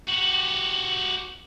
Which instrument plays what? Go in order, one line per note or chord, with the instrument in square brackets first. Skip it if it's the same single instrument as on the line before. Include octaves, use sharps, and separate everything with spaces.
[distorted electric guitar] F#4 G4